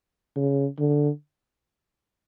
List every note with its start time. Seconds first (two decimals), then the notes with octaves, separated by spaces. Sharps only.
0.36 C#3
0.79 D3